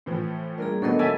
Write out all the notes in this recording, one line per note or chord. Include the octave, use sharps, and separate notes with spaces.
A2 E3 F3
G3 A#3 D4 G#4 A#4
D#3 F#3 A3 B3 D4 A4 A#4 D#5
F#3 B3 E5 G#5 A5